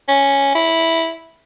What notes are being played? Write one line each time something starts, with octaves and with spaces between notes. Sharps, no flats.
C#4
E4